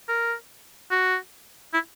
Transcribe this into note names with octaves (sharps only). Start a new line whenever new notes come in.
A#4
F#4
E4